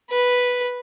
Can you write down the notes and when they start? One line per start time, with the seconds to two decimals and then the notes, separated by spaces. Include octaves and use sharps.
0.11 B4